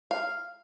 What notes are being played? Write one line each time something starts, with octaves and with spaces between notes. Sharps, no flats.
F5